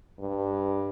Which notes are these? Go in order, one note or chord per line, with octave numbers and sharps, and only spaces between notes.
G2